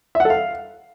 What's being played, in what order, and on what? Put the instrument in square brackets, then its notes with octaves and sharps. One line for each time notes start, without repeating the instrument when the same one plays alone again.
[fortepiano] E5
F#5
A4
F5